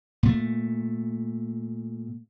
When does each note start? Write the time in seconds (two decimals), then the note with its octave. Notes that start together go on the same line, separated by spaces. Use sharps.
0.23 A#2 A3